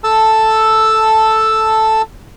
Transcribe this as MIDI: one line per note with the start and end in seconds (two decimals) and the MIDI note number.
0.04 2.02 69
0.04 2.02 81
0.04 2.02 88